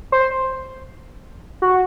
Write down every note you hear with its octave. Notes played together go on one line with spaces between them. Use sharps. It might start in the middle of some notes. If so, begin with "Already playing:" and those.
C5
F#4